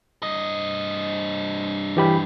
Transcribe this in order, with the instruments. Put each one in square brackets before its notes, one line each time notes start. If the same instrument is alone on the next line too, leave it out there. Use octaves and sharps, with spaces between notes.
[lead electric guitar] G2 D#5
[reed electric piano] E3 G4 B5